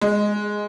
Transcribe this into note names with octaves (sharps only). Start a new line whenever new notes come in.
G#3